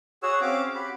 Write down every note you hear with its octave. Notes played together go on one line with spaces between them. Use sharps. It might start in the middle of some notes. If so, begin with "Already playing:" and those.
F#4 G#4 C#5 F#5 E6
C4 C#4 F5 D6
F#4 G4 B5